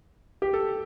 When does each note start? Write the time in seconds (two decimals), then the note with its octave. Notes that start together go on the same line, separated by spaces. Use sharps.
0.42 G4
0.54 A4